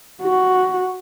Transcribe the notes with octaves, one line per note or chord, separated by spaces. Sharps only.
F#4